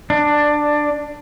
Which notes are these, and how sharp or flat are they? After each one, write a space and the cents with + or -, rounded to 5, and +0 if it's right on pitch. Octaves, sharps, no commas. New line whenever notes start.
D4 +10